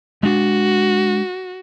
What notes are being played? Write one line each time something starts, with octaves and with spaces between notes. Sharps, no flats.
G#3 D4 F#4